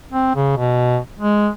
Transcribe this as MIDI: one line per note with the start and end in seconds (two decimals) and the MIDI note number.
0.12 0.34 60
0.35 0.55 49
0.57 0.98 47
1.19 1.50 56